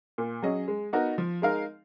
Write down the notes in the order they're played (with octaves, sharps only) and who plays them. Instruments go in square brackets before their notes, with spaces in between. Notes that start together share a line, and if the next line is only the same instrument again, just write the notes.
[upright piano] A#2
F#3 C#4 G#4 D#5
G#3
B3 D#4 F#4 A#4
F3
G#3 D#4 A#4 F5